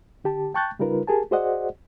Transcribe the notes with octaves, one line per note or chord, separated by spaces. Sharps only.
D3 G4 A5
G5 A5 C#6 F#6 G6 A6
C#3 G3 D#4 F4 A#4 B4
G4 G#4 A#4 G#5 A5
F#4 G#4 C5 D5 D#5 F#5